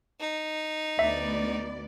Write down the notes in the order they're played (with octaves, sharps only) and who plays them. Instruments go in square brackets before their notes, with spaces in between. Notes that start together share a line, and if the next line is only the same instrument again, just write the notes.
[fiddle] D#4
[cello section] D2 B3 D5 [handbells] E5